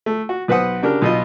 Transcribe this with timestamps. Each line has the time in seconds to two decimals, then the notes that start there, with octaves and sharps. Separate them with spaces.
0.06 A3
0.29 F#4
0.48 B1 B4 C5 F#5 D#6
0.83 C#3 D4 G4 A#4
1.02 B1 B2 F4 D#5